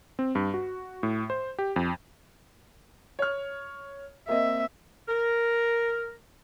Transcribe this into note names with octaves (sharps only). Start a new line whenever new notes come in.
C4
G2
F#4
A2
C5
G4
F2
C#5 F6
A#3 C4 D#5 E5
A#4